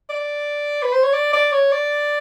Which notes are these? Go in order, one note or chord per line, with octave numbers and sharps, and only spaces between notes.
D5
B4
C5
C#5
D5
D5
C#5
D5